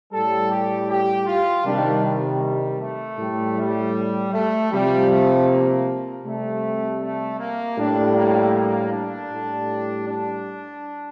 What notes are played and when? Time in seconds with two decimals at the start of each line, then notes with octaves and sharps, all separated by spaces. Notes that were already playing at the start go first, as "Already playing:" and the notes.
0.12 A2 G3 A4
0.51 G4
0.89 G4
1.27 F4
1.65 C3 D#3 G3 D4
2.03 G3
2.42 G3
2.80 A3
3.19 A2 G3
3.57 G3
4.33 A3
4.71 C3 F3 G3
5.10 A3
5.48 A#3
6.25 C3 G3 A3
7.01 A3
7.40 A#3
7.78 A2 G3 D4
8.16 A#3
8.54 A#3
8.92 D4
9.31 A2 G3
10.08 D4